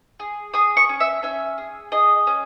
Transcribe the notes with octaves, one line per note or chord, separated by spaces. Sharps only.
G#4
G#4 D#6
C#6
C#4
E5
C#4 E5
G#4
G#4 D#5
C#4